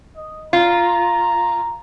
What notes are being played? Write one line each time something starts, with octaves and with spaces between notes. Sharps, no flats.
D#5
F4 A#5